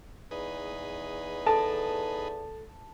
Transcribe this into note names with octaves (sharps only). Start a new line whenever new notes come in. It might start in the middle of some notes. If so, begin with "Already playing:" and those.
E2 D#4 G#4 B4
A4 A5